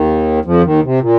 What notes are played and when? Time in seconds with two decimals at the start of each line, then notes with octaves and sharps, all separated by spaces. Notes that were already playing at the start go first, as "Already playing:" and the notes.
Already playing: D#2 D#3
0.45 F2 F3
0.63 D#2 D#3
0.83 C3
1.01 A#2